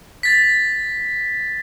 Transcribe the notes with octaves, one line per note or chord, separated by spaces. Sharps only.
A6 B6